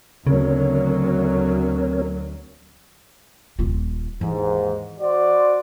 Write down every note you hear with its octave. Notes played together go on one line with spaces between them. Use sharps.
D2 C#3 F#3 C4 A#4 C#5
D#1 F4
D#2 G#2 E3
F#4 C5 D5